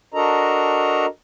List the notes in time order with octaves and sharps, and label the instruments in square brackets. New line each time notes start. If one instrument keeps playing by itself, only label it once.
[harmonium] D4 F#4 A4 A#4 D#5 A#5